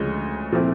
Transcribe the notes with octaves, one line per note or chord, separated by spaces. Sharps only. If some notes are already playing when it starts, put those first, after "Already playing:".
Already playing: D2 C#3 F3 G#3 C#4
A#2 F3 A3 C4 E4